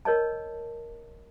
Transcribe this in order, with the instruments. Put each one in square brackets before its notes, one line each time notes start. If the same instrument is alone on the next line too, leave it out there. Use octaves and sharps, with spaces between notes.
[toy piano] A#4 C#5 D#5 A5